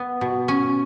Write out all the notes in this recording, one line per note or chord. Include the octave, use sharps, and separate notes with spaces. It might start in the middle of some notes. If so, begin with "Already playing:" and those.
Already playing: B3
B2
C#4